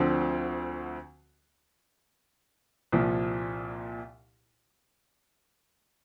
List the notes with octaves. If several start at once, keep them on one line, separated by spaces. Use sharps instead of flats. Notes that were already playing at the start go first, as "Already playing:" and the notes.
Already playing: D2 D3 F3 C4
C2 A#2 F3